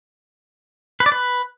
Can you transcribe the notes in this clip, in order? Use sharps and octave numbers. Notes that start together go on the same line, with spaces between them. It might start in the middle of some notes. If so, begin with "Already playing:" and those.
B4
D5
B4